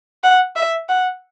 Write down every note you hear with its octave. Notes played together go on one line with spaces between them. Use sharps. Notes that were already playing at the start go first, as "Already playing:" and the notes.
F#5
E5
F#5